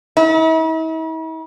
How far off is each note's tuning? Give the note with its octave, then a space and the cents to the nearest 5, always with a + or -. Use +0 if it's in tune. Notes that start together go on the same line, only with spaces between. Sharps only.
E4 -45